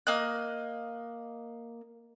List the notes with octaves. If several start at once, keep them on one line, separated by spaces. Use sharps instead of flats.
A#3 D#5 F#6